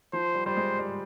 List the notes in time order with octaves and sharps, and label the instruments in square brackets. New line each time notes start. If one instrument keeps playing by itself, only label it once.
[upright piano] F3 [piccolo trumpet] C5
[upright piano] G3
[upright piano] G3 [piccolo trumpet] C5
[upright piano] G#3
G3